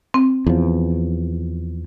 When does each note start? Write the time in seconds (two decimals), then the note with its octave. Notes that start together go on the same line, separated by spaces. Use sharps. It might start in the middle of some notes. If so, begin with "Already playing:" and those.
0.14 C4
0.47 E2 F3